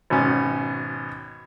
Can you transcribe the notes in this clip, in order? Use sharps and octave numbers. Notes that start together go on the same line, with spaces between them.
G#1 B2 C#4